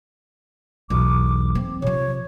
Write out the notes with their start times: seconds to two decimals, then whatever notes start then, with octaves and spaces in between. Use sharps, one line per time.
0.90 B1 E2 D6
1.55 C4
1.82 C3 F3 C#5